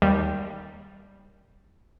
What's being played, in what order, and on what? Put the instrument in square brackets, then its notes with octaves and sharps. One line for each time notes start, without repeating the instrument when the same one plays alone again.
[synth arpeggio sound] D#2 G3